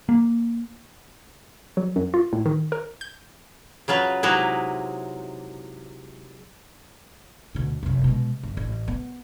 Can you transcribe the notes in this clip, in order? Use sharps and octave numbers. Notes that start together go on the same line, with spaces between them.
A#3
F#3
F#2
F4
A2
D#3
A#4
G6
C#3 F#3 F4 B4
C3 F#3 G#3 D#4 E4 B4
D2 B2
F1 F#2
B2 G#3
G1
A1
B3